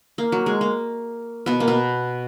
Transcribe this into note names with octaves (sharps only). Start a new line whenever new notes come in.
A#3
F#3
G#3
A#3
B2 B3
A#3
B2 B3